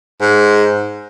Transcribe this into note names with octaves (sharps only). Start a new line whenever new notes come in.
G#2